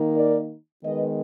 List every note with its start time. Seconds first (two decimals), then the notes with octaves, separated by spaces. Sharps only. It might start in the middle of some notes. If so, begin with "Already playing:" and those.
Already playing: D#3 A#3 D#4
0.16 A#4 D5
0.84 D#3 G#3 B3 B4 D#5